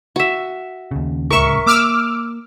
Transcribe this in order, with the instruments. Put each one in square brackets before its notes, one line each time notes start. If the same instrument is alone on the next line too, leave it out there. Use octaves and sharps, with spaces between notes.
[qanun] F#4 E5
[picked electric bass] D#2 C#3
[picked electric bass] D1 C#2 C#3 [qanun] A#4 E5 [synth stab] C#6
[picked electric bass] A#3 [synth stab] D6 E6 F6